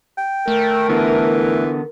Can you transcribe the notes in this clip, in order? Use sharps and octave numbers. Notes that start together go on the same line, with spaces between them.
G5
A3 A#4
D3 E3 B3